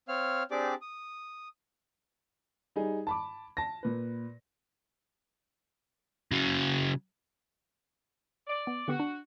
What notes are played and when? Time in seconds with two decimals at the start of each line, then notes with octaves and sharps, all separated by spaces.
0.08 C4 C#5 F5 F6
0.51 C4 D4 G4 G#4 D5 D6
0.82 D#6
2.76 G3 D#4 G#4
3.07 A5 B5 D6
3.57 A5 A#6
3.83 A#2 B4
6.32 C#3 F#3
8.47 D5
8.67 B3
8.88 D3 B3 F#4 G4
9.00 D4